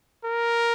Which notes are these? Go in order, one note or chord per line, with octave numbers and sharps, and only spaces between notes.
A#4